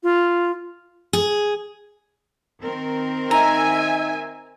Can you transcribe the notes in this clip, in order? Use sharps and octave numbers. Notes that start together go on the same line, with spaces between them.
F4
G#4
D#3 C4 A#4
D#4 E5 G#5 A#5